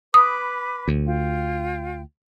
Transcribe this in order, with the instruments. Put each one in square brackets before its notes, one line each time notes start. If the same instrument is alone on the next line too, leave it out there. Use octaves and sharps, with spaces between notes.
[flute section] B4 B5 D6 [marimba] D#6
[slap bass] D2
[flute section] F4 G5